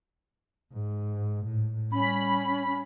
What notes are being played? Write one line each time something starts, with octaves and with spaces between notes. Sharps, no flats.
G#2
A2
G3 C#4 B5